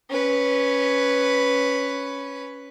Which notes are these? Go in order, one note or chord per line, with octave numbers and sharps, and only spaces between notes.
C#4 B4